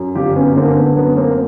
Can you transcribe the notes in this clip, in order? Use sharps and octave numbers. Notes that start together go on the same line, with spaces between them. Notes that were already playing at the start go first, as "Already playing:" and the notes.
Already playing: F#2
G1 F4 G4
B3 C#4
D3 A#3 C4
B3
F#2 B3
A#3 C4